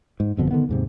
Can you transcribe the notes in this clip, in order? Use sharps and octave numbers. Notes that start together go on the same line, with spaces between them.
G#2
G1 F2 B2 D3
D3 D#3 B3
D#2 G#2 C3